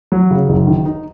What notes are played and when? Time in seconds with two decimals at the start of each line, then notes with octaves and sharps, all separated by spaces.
0.12 F#3
0.31 C#3
0.49 F#1
0.67 D#3
0.86 D#4